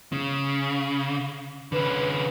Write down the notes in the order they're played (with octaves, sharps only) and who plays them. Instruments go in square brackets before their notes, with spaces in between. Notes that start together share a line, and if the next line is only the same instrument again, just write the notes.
[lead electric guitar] C#3
[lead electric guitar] D3 C#4 [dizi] B4